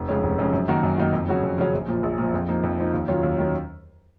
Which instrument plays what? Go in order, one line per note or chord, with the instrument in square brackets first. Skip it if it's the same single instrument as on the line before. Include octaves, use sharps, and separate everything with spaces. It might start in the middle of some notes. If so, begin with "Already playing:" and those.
Already playing: [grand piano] F1
F2 C#3 G#3 C#4
F1
F2 C#3 G#3 C#4
F#2
D#3 A#3 D#4 F#4
F#2
D#3 A#3 D#4 F#4
F2
C#3 F#3 C#4 F#4
F2
C#3 F#3 C#4 F#4
A#1
A#2 F3
A#1
A#2 F3
F2
F3 A#3 D#4
F2
F3 A#3 D#4
D#2
D#3 F#3 C#4 F4
D#2
D#3 F#3 C#4